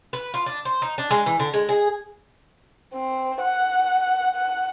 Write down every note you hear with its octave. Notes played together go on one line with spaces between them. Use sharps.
B4
F4
D4
C5
D#4
D4
G#3
E3
D3
G#3
G#4
C4
F#5
F#5